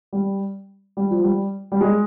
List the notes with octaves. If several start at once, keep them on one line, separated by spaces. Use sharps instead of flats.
G3
G3
F3
G3
G3
G#3